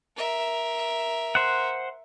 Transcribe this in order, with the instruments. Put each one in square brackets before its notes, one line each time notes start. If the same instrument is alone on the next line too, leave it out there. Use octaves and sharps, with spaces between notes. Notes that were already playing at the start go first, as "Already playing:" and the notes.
[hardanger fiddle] A#4 E5
[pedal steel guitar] C5 F#5